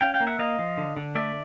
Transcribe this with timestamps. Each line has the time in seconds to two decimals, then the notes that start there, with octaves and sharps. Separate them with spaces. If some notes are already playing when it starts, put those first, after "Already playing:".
0.01 C#4 F5 G5
0.14 F5 G5
0.20 A#3
0.27 E5 F#5
0.39 A#3 D#5 F5
0.59 F3
0.77 D3
0.97 D3
1.15 A3 D5 E5